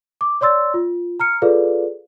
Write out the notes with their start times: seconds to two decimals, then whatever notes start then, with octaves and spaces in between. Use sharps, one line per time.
0.21 D6
0.41 C#5 D5 C6 E6 A6
0.74 F4
1.20 A#5 F6 C#7
1.42 F4 G#4 A4 B4 D5 F5